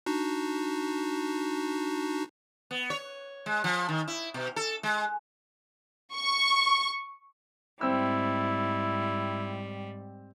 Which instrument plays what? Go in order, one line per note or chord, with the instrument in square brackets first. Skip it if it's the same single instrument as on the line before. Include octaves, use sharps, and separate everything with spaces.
[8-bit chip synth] D4 D#4 F#4
[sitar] B3
C#5
G#3
F3
D#3
E4
B2
A4
G#3
[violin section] C#6
[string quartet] G#2 G3 [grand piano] C4 E6 [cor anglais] E4